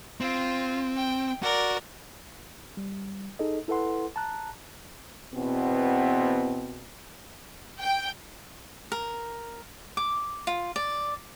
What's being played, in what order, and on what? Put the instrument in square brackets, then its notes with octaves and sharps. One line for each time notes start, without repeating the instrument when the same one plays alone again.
[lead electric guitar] C4 [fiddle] F4
[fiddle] G5
[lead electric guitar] F#4 [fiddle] A#4 D5
[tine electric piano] G3
D#4 G#4 A4 D#5
E4 A4 B4 F#5 C6
A5 A#5 F#6
[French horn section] E2 B2 B3 C4
[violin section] G5
[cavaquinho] A#4
D6
F4
D5